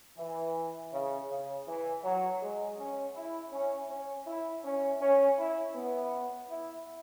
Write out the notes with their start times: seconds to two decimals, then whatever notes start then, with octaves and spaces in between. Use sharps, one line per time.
0.18 E3
0.93 C#3
1.30 C#3
1.68 E3
2.04 F#3
2.42 G#3
2.79 C#4
3.16 E4
3.53 C#4
3.90 C#4
4.27 E4
4.65 C#4
5.01 C#4
5.38 E4
5.76 B3
6.50 E4